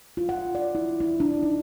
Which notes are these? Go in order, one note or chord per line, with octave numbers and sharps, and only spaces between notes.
F4
F#5
D5
E4
E4
D4
D#4